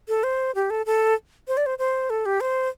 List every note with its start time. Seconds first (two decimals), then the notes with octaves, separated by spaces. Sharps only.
0.08 A4
0.23 C5
0.55 G4
0.70 A4
0.86 A4
1.48 C5
1.57 D5
1.66 C5
1.79 C5
2.10 A4
2.26 G4
2.41 C5